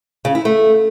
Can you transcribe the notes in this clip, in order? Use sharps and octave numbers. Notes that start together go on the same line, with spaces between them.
C#3
E4
A3